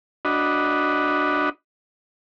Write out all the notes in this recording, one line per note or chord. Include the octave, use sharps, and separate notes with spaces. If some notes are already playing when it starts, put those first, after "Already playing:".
D4 F#4 D#5 B5